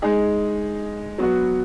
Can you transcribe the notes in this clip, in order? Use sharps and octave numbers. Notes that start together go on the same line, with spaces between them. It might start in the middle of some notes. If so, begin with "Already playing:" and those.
G#3 D#4 G#4
F#3 B3 F#4